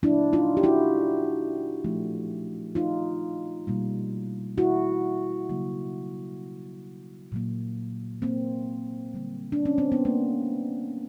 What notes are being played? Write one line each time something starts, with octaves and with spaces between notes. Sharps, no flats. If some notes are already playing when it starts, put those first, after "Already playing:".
A#2 F#3 A#3 D4 E4
D#4 F4
G4
E4 F#4
A#2 F3 A3
D#4 F4
B2 G3 A#3
E4 F#4
C#3 F#3 A#3
A#2 F#3 A#3
A#3 C4
D3 G3 A#3
D4
C#4
C4
B3
A#3